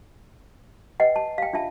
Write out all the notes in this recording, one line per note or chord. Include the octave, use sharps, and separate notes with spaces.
B4 D#5 F#5 G5
A5
F5 G5
D4 F4 E5 A5